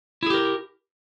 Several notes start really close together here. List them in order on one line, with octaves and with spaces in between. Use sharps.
E4 G#4 G4 A#4